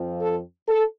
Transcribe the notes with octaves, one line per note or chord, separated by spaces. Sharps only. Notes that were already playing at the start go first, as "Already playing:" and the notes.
Already playing: F2 F3 C4
A4
A4